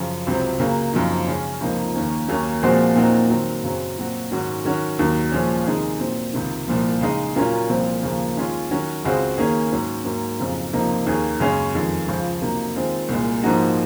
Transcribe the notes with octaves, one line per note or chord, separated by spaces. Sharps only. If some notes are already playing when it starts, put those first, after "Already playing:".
Already playing: F#2 C#3 F3
C#2 C3 F#3 C4
C#3 F#3 A#3
F#2 C#3 F3 C4 D#4
C#3 G#3 C#4
C#2 C3 F3 A#3 D#4
D#2 D#3 A#3 C#4
D#2 D#3 F#3 A#3 C#4
A#2 F3 G#3 C4 F#4
A#2 F#3 C4 D#4 F#4
D#3 F#3 C4
F#2 C#3 F#3 C4
A#2 F#3 C4 F#4
G#2 D#3 F#3 C#4 F#4
D#3 F#3 C#4 F#4
D#2 D#3 F#3
A#2 F3 G#3 C#4
C3 D#3 G#3 D#4 G#4
A#2 F#3 C4
C#2 C3 D#3
C2 A#2 F3
C#3 G#3 D#4
A#2 F#3 A#3 C#4 F4
C2 A#2 F3 C4
D#2 C#3 F3 A#3
D#3 G#3 C#4 F4
D#3 F#3 C#4 F#4
C#2 C#3 G#3 C4 F#4
D#3 A#3 C#4 G#4
G#2 F#3 C#4
G#2 F#3 A#3
F2 C#3 F#3 C4 D#4
C#2 C3 F3 A#3 D#4
D#2 D#3 A#3 C#4 G#4
F#2 C#3 G#3 C#4
F2 D#3 G#3
C#2 C#3 F3
C3 F#3 A#3 D#4
D#3 G#3 C4 F4
C2 A#2 G#3
G#2 F3 A#3 D#4 F#4